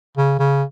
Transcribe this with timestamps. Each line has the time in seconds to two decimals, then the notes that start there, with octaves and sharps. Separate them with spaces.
0.17 C#3
0.39 C#3